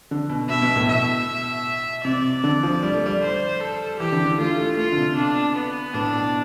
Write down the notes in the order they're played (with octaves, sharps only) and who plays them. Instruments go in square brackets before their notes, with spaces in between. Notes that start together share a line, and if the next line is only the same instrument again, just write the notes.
[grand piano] D3
B2
[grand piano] B2 [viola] E5
[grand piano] B2
A2
[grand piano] B2 [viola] E5
[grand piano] C3 [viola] D5
[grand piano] D3
F3
G3
A3
G3
[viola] C5
A4
[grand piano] E3 [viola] G4
[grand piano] D3
D3
[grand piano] A3 [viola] F4
[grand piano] A3
[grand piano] A3 [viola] F4
[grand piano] D3
C3
[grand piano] B2 [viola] D4
[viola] B3
[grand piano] A2 [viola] D4
[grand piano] B2